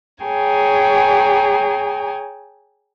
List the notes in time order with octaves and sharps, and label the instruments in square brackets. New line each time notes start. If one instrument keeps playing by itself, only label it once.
[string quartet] G#4 C#5 G5 G#5 A#5